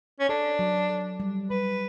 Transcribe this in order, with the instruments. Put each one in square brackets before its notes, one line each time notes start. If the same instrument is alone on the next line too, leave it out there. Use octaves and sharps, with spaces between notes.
[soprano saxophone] C#4
[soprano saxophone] D4 [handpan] A4
[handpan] F#3
A4
G3
[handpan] G3 [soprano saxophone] B4